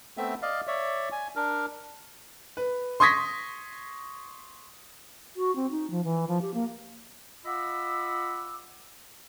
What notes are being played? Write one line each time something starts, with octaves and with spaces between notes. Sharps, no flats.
A3 B3 C4 E5
D5 D#5 F5
C#5 D5 E5
G#5
D4 A#4
B4
C6 C#6 D#6 G#6 A#6 B6
F#4
C4
D#4
F3
E3
F3
G4
A#3
F4 D#5 F#5 B5 D6 E6